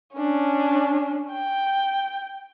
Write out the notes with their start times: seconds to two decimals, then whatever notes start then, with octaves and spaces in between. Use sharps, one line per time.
0.15 C#4 D4
1.32 G5